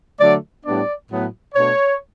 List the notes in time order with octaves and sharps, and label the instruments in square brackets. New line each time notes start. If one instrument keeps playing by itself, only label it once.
[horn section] D3 F#3 A3 D5
A2 G3 B3 D4 D5
A2 F#3 B3
B2 A3 D4 C#5